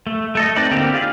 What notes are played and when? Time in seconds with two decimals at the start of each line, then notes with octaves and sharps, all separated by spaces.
0.07 A3
0.35 A3 A4 D#5
0.56 C4 D#4 B4 D5
0.71 D3 A#3 C4 G4
0.94 F4 G4 G#4 D5 F5